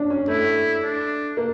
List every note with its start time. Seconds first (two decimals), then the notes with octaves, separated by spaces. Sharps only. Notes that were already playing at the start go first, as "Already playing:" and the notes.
Already playing: C#4 D4
0.10 C#4
0.28 A3 E4
0.83 D4
1.37 A#3